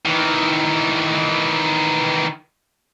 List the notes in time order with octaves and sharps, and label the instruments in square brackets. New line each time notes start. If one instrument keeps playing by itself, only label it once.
[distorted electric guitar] D#3 E3